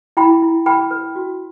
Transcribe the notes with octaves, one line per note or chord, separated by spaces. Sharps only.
E4 G5 B5
E4
B4 G5 B5
B4
F#4